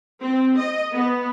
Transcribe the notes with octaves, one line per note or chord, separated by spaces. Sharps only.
C4
D#5
B3